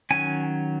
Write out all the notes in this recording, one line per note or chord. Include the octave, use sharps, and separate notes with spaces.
D#3 F#3 C#4 G#5